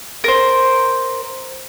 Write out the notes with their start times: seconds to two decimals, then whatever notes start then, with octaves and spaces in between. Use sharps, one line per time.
0.24 A#4 C5